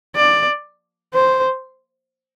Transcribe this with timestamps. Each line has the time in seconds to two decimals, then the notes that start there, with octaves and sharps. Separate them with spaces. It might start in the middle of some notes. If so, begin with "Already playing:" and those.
0.16 D5
1.14 C5